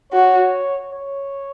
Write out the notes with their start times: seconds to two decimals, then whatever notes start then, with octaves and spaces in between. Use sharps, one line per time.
0.13 F#4 C#5
0.92 C#5